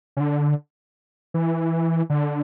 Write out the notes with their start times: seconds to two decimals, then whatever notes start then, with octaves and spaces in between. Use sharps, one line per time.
0.17 C#3
0.20 D3
1.34 E3
2.10 D3